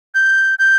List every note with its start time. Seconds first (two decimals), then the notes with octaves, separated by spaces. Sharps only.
0.15 G6
0.59 G6